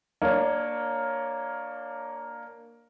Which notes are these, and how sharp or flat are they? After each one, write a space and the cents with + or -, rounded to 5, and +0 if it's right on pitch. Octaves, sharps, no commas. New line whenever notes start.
A#3 +0 D4 +20 C#5 +0